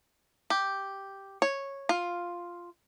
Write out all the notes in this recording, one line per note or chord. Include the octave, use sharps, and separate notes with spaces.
G4
C#5
F4